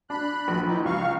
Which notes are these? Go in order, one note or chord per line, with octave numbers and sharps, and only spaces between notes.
D4 B5 F#6
A#1
E3 D#4
C#2 F5 C#6